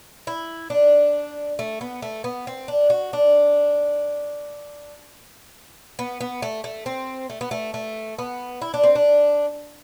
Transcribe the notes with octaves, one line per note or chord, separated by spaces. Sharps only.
E4
D4
A3
B3
A3
B3
C4
D4
F#4
D4
B3
B3
A3
A3
C4
A3
B3
A3
A3
B3
E4
D4
C4
D4